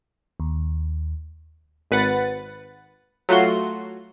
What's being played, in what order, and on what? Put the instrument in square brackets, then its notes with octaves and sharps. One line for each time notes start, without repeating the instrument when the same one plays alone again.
[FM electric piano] D#2
[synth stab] G#1 B4 F#5 A6
F#3 A3 F4 F#4 C6